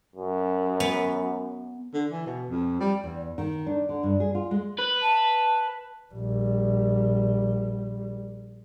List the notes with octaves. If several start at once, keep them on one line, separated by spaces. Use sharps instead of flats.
F#2
B3
D3
E3
B2
F2
G3
E2
D#3
D4
D3
G2
G#4
F4
G#3
B4
A5
A#1 G3